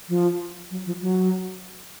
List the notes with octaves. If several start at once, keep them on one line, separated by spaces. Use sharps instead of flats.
F3
F#3
F3
F#3